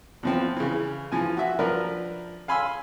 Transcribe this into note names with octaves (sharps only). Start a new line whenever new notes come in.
E2 F3 C4
C#3 E3
E3 F3 G#5
F#4 E5
F3 D4 A#4 B4
F5 G#5 B5 C6 E6